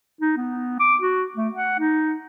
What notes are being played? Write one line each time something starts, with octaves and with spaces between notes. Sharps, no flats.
D#4
B3
D6
F#4
A3
F#5
D#4